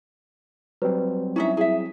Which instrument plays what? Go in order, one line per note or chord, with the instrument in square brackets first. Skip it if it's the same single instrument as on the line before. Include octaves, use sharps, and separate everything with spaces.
[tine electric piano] F#3 G3 C4 [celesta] B4
[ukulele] C#4 D#4 E5 [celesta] E4
[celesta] E4 [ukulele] G#4 E5